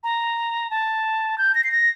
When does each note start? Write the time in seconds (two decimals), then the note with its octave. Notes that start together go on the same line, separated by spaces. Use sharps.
0.04 A#5
0.70 A5
1.38 G6
1.55 A#6
1.64 C7
1.72 A#6